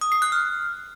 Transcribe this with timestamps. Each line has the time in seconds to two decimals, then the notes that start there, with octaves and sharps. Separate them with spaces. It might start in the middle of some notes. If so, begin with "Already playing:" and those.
0.01 D#6
0.12 C7
0.22 F#6
0.32 F6